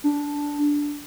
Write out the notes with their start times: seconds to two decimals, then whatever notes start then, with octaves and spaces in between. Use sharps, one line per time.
0.04 D4